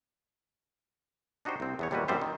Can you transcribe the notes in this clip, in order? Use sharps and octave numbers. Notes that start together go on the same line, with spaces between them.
D4 D#4 F#4 G4 C5
C2 C4
E2 B3 C#5
D#2 A#2 G3 E4 F#4 B4
A1 F#2 G3 C4 C5 E5
D#3